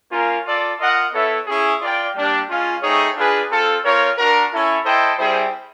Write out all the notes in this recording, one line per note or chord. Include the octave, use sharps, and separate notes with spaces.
A#3 C#4 F4 A#4
F4 A4 D5
F4 A#4 D#5 F#5
B3 E4 A4 C#5 E5
C#4 E4 G#4
F4 A#4 D5 G5
G3 A#3 D4 G4
G#3 C#4 F4
A3 C4 D#4 G#4 C#5
D4 F4 G#4 B4
C4 F4 A4
C4 F4 A#4 C#5
D4 F#4 A#4
C#4 E4 A4
E4 A4 C5 D#5 G5
G3 C4 E4 G#4 C5